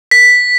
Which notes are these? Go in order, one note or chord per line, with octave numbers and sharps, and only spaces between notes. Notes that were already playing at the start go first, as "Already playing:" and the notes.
B6